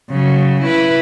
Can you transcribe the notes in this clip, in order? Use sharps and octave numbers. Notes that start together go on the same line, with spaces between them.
C#3 F#3
E4 B4